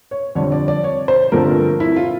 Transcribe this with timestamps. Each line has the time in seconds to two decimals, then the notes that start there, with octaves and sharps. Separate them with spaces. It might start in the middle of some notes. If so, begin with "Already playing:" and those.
0.11 C#5
0.35 F2 D3 G3 C4 C#5
0.52 D5
0.68 D5
0.84 C#5
1.08 C5
1.32 G2 D3 F3 A3 C4 A#4
1.80 E4
1.96 F4